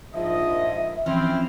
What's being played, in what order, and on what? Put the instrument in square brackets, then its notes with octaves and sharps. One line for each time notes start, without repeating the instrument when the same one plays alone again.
[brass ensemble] A#1 F4 D#5 [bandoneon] G#2 F3 [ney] E5
[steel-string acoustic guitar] E3 F3 C#4 [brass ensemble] C4 [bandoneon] E4 F6